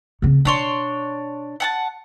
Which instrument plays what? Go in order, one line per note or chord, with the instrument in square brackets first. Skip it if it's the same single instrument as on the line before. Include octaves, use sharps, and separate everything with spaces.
[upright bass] C#3 C4
[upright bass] B2 [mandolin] D4 C#5 C6
[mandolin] F#5 G#5 A5